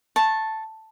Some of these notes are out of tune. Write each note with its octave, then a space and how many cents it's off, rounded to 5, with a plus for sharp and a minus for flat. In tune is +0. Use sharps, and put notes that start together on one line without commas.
A5 +0 C#6 -25